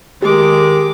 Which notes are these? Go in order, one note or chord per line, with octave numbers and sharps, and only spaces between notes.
D#3 G#3 G4 D6